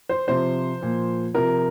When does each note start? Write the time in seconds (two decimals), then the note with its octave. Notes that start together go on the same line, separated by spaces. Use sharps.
0.09 C5
0.27 C3 F3 C5
0.81 A#2 F3
1.34 C3 F3 A#4